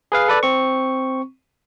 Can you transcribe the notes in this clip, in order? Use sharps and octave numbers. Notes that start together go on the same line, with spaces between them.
G#4 B4 F5
A4 B4 D5
C4 C#6